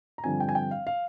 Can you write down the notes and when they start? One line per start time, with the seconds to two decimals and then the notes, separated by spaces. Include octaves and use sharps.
0.18 A#5
0.24 G2 D3 F3 C4 G#5
0.40 G5
0.49 G#5
0.55 G5
0.71 F5
0.87 F5